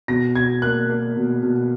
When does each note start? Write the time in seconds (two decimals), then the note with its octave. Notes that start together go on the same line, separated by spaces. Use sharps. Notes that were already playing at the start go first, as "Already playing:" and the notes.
0.08 B2 A#6
0.35 B2 G#6
0.62 A#3 F#6
0.90 A#3
1.17 B2
1.43 B2